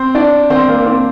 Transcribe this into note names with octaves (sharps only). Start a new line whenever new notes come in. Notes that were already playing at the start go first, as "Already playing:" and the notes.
Already playing: C4 C5
D4 D5
C4 C5
A#3 A#4
C4 C5